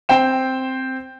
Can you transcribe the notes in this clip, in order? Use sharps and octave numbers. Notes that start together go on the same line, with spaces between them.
C4 C5 G5 E7